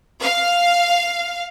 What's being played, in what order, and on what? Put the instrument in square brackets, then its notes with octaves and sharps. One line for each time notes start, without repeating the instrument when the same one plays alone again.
[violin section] F5